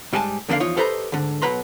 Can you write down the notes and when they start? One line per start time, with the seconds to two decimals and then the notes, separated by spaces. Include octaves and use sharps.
0.13 G#2 G3 G#3 G#5 A5
0.49 F2 D3 G#3 A#3 D4 F5
0.60 E2 F3 D#4 F4 C#5
0.77 G4 A4 B4 C5 D#5 A#5
1.12 D2 G#2 D3
1.42 B1 B2 F#3 B4 A#5 C6